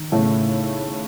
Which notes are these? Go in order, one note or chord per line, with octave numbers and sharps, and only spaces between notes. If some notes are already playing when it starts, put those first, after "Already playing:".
Already playing: D#3
A2 C#3 A3